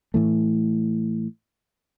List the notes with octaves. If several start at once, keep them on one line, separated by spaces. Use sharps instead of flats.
A2 E3 A3